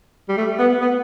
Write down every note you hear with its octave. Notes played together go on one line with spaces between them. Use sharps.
G3
A3
B3
B3